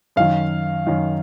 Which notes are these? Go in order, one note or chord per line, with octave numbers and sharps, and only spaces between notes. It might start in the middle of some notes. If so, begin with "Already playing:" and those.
F#2 D#3 F5
F#2 D#3